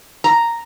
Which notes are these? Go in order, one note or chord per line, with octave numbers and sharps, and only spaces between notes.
A#5